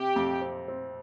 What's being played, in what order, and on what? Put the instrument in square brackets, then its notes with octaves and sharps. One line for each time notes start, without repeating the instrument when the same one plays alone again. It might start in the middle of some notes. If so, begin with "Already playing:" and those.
Already playing: [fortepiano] C3 [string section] G4
[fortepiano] F2
C4
C4